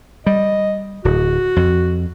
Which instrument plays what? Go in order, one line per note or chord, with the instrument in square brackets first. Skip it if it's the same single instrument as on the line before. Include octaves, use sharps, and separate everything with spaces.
[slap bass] G3 [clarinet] D#5
[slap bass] D1 [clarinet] F#4
[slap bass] F2